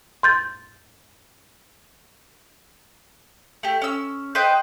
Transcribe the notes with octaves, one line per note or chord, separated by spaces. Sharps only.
C6 G6 A6
A3 G4
C#4 E6
B4 C5 D#5 G5